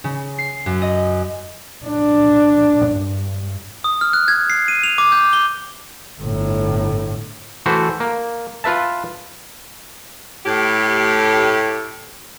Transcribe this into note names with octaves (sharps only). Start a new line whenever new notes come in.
C#3
C7
F#2
D#5
D4
G2
D#6
F6
F#6
G#6
C7
D#7
F7
D6
G6
G7
G1 A2
E3 A3 F#4 A4 C5
A#3
F4 B4 E5 A5
A2 G4